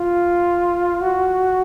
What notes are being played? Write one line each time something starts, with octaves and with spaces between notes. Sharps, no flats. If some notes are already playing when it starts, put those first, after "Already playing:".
Already playing: F4
F#4